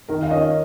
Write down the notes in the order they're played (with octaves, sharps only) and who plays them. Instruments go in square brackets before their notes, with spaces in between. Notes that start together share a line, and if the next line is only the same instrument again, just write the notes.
[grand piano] D#3 [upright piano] A#4
[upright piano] F5
[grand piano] C#4 [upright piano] D#5